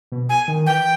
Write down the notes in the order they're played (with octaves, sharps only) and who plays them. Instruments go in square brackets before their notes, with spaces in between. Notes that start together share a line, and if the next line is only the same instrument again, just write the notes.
[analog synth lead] B2
[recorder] G#5
[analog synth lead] D#3
[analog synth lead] E3 [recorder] G5